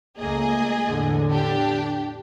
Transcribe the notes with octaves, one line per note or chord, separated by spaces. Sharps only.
C#2 A3 A#3 G#4 D#5 G#5
E2 A2 D3
D4 G4